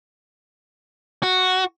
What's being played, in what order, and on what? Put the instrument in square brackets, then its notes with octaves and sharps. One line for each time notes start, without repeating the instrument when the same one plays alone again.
[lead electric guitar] F#4